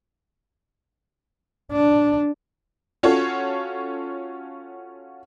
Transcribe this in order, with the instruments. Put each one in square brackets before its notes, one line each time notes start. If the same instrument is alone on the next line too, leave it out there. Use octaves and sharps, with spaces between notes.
[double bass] D4
[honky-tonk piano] C#4 F4 F#4 A4 C#5